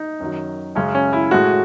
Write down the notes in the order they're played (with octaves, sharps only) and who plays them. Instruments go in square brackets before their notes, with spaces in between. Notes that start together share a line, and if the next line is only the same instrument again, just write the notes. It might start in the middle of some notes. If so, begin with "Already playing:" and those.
Already playing: [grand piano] D#4
F#2 D#3 F#3
F#2 C#3 G#3 C#4
C#4
E4
A2 G#3 F#4